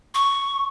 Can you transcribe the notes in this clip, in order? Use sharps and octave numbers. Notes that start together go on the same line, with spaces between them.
C#6